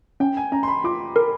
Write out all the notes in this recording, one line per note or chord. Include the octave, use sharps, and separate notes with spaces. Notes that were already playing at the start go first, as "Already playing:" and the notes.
C#4 G5
G#5
C#4 A#5
C6
B5
F4 D6
A#4